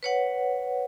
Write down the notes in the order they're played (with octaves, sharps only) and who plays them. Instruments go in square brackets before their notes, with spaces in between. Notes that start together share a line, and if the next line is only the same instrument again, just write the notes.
[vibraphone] B4 C#5 F#5